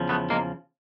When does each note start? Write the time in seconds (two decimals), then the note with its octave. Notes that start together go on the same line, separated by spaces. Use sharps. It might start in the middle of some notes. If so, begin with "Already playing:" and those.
Already playing: E2 C#3 F3
0.09 A3 B3
0.30 G#3 A#3